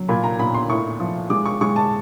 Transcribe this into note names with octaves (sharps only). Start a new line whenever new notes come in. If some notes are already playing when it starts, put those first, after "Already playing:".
Already playing: F#3
A#2 B5
A#5
A#2 B5
C6
A2 C#6
F3
G#3 D6
C#6
G#3 C#6
A5